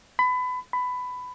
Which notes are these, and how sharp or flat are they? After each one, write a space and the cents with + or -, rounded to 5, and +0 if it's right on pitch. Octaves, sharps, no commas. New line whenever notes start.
B5 +25
B5 +15